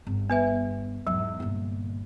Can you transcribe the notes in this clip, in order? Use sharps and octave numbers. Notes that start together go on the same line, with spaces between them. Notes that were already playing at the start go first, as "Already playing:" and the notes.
G1
B3 B4 E5
E2 G#2 F#3
G1 A#2